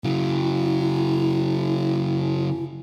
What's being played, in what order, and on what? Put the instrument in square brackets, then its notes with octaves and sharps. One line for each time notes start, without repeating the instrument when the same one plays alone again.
[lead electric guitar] C#3 F#3 [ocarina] E4